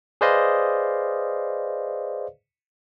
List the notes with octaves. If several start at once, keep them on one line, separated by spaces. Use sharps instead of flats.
G#4 B4 C5 D5 D#5 F5